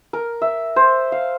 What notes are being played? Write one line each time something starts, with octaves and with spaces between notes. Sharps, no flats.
A#4
E5
C5
F5